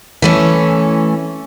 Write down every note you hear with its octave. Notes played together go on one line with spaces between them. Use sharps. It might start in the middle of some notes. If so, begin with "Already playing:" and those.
E3 A3 C#4